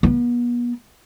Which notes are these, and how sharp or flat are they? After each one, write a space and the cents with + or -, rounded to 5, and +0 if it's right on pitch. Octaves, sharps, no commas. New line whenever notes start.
B3 -40